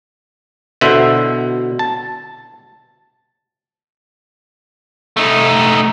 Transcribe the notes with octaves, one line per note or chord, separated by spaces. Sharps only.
B2 D3 E4 C5 E5
A5
A3 D#4